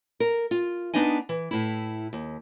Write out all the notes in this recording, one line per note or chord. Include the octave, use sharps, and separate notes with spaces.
A#4
F4
B3 D4 D#4 D#5 G#5
E3
A2 E4
D#2